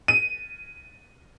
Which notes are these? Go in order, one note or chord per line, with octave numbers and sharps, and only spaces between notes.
D#7